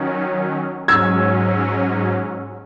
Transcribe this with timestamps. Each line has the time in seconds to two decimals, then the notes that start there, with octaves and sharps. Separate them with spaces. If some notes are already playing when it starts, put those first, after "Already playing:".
Already playing: D#3 F#3 C#4
0.88 G#2 F#3 C#4 E6 G#6